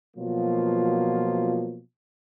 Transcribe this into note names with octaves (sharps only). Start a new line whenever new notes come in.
B2 F3 F#3 A#3 F4